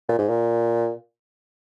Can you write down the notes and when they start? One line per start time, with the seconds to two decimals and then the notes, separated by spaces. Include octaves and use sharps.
0.09 A#2
0.19 G#2
0.29 A#2